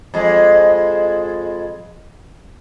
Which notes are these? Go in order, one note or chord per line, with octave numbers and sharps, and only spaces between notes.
F2 G#3